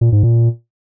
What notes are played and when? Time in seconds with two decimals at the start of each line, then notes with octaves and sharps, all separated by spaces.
0.01 A#2
0.12 G#2
0.23 A#2